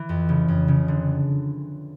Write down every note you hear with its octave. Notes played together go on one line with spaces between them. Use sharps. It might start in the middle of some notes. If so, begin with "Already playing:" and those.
Already playing: E3
F2
C#3
F2
C#3
D3